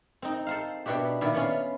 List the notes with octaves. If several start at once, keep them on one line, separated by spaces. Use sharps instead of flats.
C4 D#4
A4 C5 F5
B2 D4 E4 F#4 G4
A#2 D#3 E4 D5
B3 C#4 F4